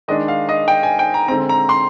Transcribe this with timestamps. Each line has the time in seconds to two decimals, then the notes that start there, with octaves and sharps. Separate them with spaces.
0.08 D#3 G#3 D4 D#5
0.28 F5
0.49 D#5
0.68 G5
0.83 G#5
0.99 G5
1.14 A#5
1.28 D3 G#3 C4 A#5
1.49 A#5
1.69 C6